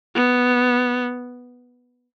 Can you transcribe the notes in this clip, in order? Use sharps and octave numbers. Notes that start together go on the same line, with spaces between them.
B3